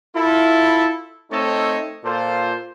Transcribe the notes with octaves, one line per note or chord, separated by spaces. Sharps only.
E4 F4 A4
A3 C4 D#4 A4 C#5 D#5
A#2 F4 A4 C5